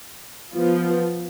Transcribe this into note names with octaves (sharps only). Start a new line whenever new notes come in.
F3 B3 F4